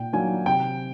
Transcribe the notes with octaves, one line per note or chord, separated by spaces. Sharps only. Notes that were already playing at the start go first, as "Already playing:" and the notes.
Already playing: A#2 G5
F#3 A#3 D4 G#5
C3 G5